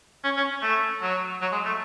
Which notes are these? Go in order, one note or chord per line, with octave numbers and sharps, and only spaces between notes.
C#4
C#4
A3
F#3
F#3
G#3
A3